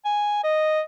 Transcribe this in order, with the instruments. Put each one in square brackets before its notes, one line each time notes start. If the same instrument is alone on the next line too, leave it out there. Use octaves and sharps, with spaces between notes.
[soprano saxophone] G#5
D#5